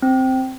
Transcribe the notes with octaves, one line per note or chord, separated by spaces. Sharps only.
C4